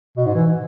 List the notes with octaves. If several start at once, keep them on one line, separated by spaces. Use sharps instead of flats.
B2
G#2
E3